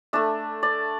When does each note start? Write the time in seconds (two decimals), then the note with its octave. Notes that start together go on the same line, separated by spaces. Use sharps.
0.13 A3 D4 E5
0.63 D5